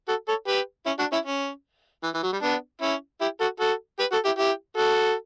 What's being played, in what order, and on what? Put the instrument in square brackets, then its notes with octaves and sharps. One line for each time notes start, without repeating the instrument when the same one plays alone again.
[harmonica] F#4 A4
A4 C#5
G4 B4
C#4 E4
D4 F#4
C#4 E4
C#4
E3
E3
F#3
G3
B3 D4
C#4 E4
E4 G4
F#4 A4
F#4 A4
G4 B4
F#4 A4
E4 G4
E4 G4
F#4 A4